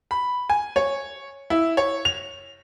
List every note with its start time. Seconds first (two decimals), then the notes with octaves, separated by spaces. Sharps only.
0.11 B5
0.49 G#5
0.76 C#5
1.50 E4
1.77 C#5
2.05 F7